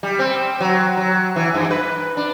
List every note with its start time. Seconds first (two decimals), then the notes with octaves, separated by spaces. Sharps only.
0.03 G3
0.19 C4
0.61 F#3
0.97 F#3
1.36 E3
1.54 G2
1.70 B4
2.17 D4